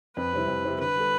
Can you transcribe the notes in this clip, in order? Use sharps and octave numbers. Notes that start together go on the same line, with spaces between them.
F2 B4
C3 G3 C4 E4
F2
C3 G3 C4 E4
D3 B4
G3 D4 A4